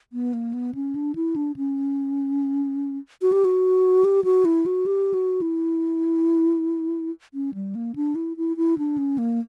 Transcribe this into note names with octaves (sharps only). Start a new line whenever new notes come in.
B3
A#3
B3
C#4
D4
E4
D4
C#4
F#4
G4
F#4
G4
F#4
E4
F#4
G4
F#4
E4
C#4
G3
A#3
D4
E4
E4
E4
D4
C#4
A#3